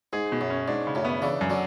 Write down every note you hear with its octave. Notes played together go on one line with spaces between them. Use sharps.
G#2 G#4
B2
F#2
C#4
G#2 D4
C#3
F#2 A2
B3
C#3 E3 D4
F#2
D3 F#3